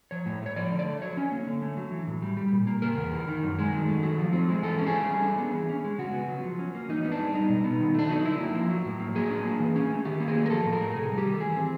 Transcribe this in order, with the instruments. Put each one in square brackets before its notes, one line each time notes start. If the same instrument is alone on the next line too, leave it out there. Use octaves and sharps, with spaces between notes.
[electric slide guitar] F3 C#5
A2
A3
C#5
F3 D5
D3
D5
A3
F#3 C#5
C#4
A#3
D3
A3
F#3
E3
A2
G3
G3
A#2
A#3
C#3 A#4
E2
E3
D#3
F#2
G#3
D#3
A3
F#3
F3
C4
G#3
E3 A4
C#4
G#4
A3
G3
D4
B3
E3
C#4
G#3
C#3 F#4
B3
F#3
F3
C#4
A#3
E3 D#4
B3 D#4
D4
G#3
G3 D#4
B2
B3
D#3
A3 D4
F#3 D#4
D3 E4
A#3
F3
F#3
A2
A#3
F#3 G#4
D4
A#3
E3
C#4
A3
D#3 G4
A#3
G#4
F#3
A#4
F3 A4
A2
A#4
A3
C3 G#4
G3
G4
D#3
A4
E3 G#4
C4